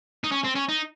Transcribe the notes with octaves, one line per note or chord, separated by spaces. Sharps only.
D#4
C#4
C4
C#4
D#4